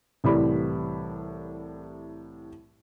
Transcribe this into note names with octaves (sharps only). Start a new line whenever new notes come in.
C2 A2 E3 G3 D5 B5